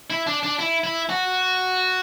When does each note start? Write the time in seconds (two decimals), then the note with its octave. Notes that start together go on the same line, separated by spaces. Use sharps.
0.10 E4
0.27 D4
0.43 D4
0.59 E4
0.84 E4
1.09 F#4